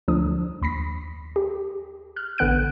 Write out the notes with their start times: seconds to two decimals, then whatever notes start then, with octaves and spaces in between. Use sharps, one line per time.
0.08 D2 D3 F3 D4 D#6
0.62 D#2 B5 A#6 B6
1.36 G4
2.16 F6 F#6
2.38 A1 D3 B3 F#6 D7